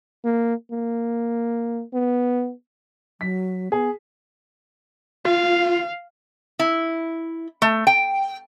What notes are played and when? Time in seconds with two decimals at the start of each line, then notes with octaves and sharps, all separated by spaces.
0.24 A#3
0.72 A#3
1.94 B3
3.21 F#3 B6
3.72 B3 G#4
5.25 F4 F5
6.59 E4
7.62 A3
7.87 G5